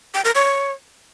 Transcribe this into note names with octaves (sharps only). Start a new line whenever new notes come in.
G5
A#4
C#5